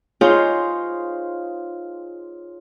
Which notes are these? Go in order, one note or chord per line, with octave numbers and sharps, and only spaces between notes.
D#4 F4 G#4 C5 C#5